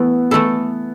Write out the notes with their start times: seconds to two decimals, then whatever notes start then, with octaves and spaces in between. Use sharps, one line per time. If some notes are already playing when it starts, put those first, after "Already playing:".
Already playing: E3 A3 B3 E4
0.31 E3 A3 E4 A4